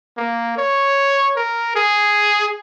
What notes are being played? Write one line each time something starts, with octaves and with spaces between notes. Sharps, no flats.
A#3
C#5
A#4
G#4